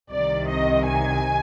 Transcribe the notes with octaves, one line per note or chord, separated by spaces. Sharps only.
C2 C3 D#3 D5
D#5
G#5